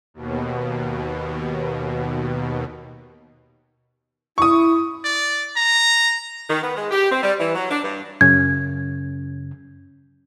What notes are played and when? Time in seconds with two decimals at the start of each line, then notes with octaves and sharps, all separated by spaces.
0.14 D#2 B2
4.38 E4 C#6 D#6
5.05 D5
5.57 A#5
6.50 D#3
6.63 B3
6.76 G#3
6.91 G4
7.11 C4
7.23 G3
7.39 E3
7.54 F#3
7.70 D4
7.83 G2
8.21 F#2 C#3 C#4 G#6